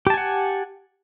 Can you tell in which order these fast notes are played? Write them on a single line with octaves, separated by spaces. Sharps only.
G4 A5 G#5 F#5